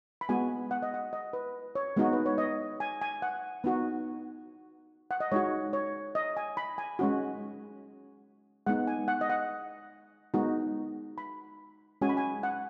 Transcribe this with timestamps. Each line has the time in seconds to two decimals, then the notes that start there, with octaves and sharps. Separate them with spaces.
0.21 B5
0.29 G#3 B3 F#4 G#5
0.71 F#5
0.82 D#5
0.94 F#5
1.13 D#5
1.33 B4
1.75 C#5
1.96 G#3 B3 D#4 F#4
2.13 B4
2.26 C#5
2.38 D#5
2.80 G#5
3.02 G#5
3.22 F#5
3.64 B3 D#4 F#4
5.11 F#5
5.20 D#5
5.32 G#3 D#4 F#4 C#5
5.73 C#5
6.15 D#5
6.37 G#5
6.57 B5
6.78 G#5
6.99 G#3 C#4 F#4
8.66 G#3 B3 D#4 F#5
8.87 G#5
9.08 F#5
9.21 D#5
9.30 F#5
10.34 G#3 B3 D#4 F#4
11.18 B5
12.01 G#3 C#4 F#4 G#5
12.09 B5
12.17 G#5
12.43 F#5